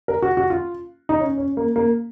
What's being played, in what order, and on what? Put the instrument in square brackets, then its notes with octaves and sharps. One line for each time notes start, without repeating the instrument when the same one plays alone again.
[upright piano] A#4
F#4
F#4
F4
D#4
C#4
C#4
A#3
A#3